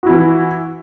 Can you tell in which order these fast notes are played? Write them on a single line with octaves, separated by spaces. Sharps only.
F#4 E4 E3